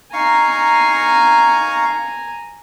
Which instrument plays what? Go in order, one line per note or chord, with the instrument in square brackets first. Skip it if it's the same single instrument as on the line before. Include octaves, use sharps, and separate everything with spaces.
[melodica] D#4 F5 C#6 [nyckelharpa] G#5 A#5